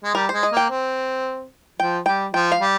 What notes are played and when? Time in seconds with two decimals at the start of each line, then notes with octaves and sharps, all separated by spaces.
0.04 G#3
0.15 G3 A#4
0.29 G#3 C5
0.43 D#5
0.52 A#3 G5
0.69 C4
1.80 F3 G5
2.06 G3 G5
2.34 F3 G5
2.52 F5
2.60 G3